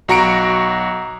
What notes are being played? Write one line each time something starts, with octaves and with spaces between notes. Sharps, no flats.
B1 F#4 A#5 C#7 D7